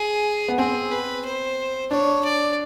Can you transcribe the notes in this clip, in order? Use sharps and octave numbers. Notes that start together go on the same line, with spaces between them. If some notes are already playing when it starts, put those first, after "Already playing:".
Already playing: G#4
B3
C4 G#4
B4
C5
D4 C#5
D5